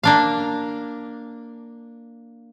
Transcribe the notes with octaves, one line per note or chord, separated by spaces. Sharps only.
A#3 D4 F5